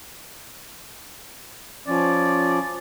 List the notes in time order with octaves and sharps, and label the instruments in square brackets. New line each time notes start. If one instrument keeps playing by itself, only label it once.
[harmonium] F3 C#4 [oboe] D5